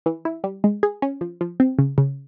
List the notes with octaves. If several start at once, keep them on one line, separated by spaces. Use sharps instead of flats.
E3
E4
G3
G#3
G#4
C#4
F3
F3
C4
C#3
C#3